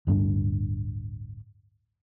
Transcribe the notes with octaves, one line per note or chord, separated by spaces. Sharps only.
D1 G1 G2 D4